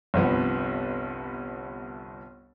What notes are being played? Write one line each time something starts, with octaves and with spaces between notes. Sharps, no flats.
G1 C2 F3 B3